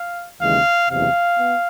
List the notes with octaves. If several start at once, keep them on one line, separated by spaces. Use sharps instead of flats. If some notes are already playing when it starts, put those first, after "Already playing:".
Already playing: F5
D#2 C#3 E3 G#3 F5
F#1 E2 C3 F5
B3